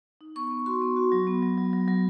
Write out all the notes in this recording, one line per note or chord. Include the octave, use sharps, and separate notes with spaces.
D#4
B3 C#6
B3
F#4 C6
B3
F#4
F#3
B3
F#3
F#3
F#3
F#3